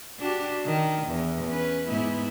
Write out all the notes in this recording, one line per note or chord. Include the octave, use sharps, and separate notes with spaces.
D4 F#4 G4
D#3
E2
C#4 B4
G#2 B3 E4